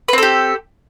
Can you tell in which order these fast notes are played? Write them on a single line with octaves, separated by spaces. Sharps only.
B4 C4 A4 G4